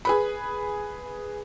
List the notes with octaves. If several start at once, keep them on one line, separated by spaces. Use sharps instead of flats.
G#4 B4 B5